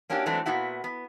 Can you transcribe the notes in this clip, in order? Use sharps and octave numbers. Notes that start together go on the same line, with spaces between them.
A#3 C#4 D4 E4 F#4 G4
E3 F#3 G#3 A3 C4 D4
A#2 B3 E4 F#4
B3